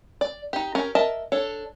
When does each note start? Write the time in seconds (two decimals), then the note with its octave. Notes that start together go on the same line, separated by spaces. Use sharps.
0.21 D5
0.53 D#4 G4
0.75 C#4 G4 A#4
0.95 A#4 D#5 E5 A5
1.32 D4 A4 C#5